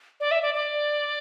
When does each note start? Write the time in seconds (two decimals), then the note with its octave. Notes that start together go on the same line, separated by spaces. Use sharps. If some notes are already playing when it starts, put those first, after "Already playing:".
0.20 D5
0.31 E5
0.42 D5
0.54 D5